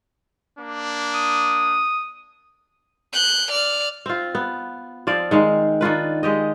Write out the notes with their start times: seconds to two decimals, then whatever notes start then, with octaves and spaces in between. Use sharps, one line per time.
0.59 A#3 D4
1.14 D#6
3.13 F#6 G6
3.51 D5 F6
4.06 C4 F4
4.35 B3
5.07 F3 C4 D5 F5
5.31 D#3 G#3 F5
5.81 D#3 D4 F4 B4
6.23 G#3 G4 D#5